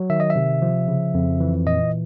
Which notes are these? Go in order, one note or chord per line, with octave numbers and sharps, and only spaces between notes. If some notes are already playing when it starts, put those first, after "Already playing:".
Already playing: F#3
D#3 E5
D#5
E5
C3
F3
C#3
F2
E3
A#2 D#5